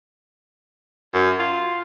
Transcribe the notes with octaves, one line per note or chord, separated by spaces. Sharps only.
F#2
F4